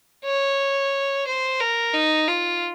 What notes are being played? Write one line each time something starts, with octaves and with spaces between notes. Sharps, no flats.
C#5
C5
A#4
D#4
F4